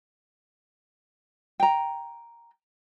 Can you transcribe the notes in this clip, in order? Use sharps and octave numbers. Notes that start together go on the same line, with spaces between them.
G5 A#5